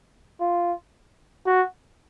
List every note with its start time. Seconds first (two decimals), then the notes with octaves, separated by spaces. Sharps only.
0.40 F4
1.46 F#4